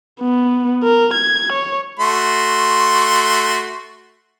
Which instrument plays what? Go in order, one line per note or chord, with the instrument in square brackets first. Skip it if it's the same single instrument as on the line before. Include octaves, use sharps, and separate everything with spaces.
[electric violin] B3
A#4
G#6
C#5
[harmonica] A3 F#4 C6